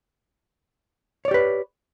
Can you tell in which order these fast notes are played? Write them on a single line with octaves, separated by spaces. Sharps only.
C#5 D5 G4 B4